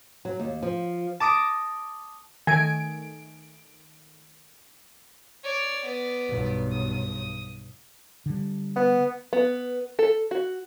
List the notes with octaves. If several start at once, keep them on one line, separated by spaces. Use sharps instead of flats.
F#3
D#2
F3
A5 D6 D#6 A#6 D7
D#3 A3 G#5 D7
C#5 D5
B3 D5
B1 G2
D#6
D3 G3
B3
B3
A4
F#4